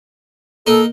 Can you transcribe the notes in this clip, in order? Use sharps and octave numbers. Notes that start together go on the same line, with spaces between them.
A#3 D#4 A4